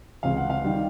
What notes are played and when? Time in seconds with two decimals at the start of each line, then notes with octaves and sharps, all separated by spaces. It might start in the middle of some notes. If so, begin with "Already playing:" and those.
0.23 C#2 C3 E3 F5
0.37 F#5
0.50 F5
0.64 D#3 G3